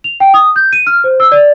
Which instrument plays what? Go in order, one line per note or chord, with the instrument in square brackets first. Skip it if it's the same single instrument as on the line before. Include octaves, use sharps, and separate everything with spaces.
[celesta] F7
G5
D#6
G6
D#7
F6
C5
E6
D5